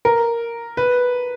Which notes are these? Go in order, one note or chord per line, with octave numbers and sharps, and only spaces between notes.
A#4
B4